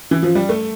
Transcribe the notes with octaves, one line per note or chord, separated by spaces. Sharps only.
E3
F3
G3
A3